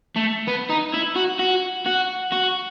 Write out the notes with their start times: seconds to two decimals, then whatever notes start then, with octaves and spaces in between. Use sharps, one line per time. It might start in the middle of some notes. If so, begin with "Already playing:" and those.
0.16 A3
0.48 B3
0.70 D#4
0.94 E4
1.16 F#4
1.39 F#4
1.86 F#4
2.32 F#4